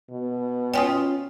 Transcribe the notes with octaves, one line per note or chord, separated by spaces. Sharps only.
B2
C#4 F4 G5 G#5 D#6